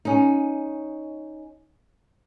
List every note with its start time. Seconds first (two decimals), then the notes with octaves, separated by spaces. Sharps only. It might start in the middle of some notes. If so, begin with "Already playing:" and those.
0.05 C#4 D#4